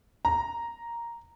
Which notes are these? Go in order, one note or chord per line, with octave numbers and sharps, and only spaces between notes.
A#5